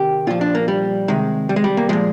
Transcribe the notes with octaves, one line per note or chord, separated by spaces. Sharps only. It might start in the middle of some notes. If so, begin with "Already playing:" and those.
Already playing: C3 D#3 G4
A#2 F3 F4
D4
A#3
G3
C3 D#3 G#3
G3
G#3
G3
A#3
A#2 F3 G#3